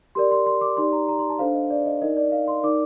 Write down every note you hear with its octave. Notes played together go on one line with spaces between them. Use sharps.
G4 A#4 D5 C6
C6
C6
D6
D#4 G4 D5 C6
A#5
A#5
C6
A5
D4 A4 C5 F5
D#5
D5
D#5
D#4 A#4 D5 D#5
D5
F5
C6
D#4 A#4 D5 D6